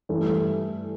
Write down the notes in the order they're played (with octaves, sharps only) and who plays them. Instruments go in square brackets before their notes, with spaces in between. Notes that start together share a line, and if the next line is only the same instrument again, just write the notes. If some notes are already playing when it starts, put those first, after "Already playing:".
[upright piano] G2 E3 A3 E4